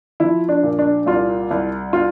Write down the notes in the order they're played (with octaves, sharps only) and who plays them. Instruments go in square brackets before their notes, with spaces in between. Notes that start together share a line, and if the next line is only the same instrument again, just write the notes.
[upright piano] F3 E4
D4
A#2
D4
C2 F4
C2
F4